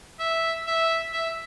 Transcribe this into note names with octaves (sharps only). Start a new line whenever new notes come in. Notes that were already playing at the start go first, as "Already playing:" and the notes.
E5
E5
E5